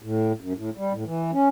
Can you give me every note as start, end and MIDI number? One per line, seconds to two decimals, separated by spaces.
0.02 0.32 45
0.41 0.53 42
0.57 0.70 45
0.77 0.93 55
0.93 1.04 45
1.06 1.31 52
1.33 1.48 61